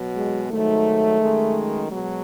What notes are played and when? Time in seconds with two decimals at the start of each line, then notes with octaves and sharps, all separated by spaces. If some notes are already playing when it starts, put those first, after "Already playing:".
Already playing: B2 F#3
0.16 G#3
0.50 G#2 D#3 F#3 A3
1.21 F#2 D#3 G#3
1.91 B2 F#3 G#3